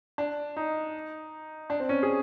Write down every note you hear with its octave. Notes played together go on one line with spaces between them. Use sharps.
D4
D#4
D4
C4
C#4
G#4